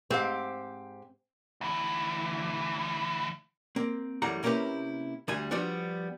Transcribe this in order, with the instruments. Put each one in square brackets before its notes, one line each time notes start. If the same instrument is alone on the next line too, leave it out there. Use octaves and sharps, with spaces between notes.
[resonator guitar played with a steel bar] G#2 G4 F5 [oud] C4
[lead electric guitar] D2 E3
[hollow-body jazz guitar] A#3 C4
F#2 E3 G3 A3 F#5 A#5
C3 A#3 C#4 E4 G4 B4
D2 G3 G#5
F3 G3 B3 D4 F#4